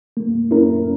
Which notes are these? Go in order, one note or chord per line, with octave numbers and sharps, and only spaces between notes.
A#3
C#4 E4 A#4